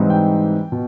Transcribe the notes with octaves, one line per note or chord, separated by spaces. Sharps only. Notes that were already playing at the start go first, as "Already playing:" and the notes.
Already playing: G#2 E3 G3 C4 D#4
G5
B2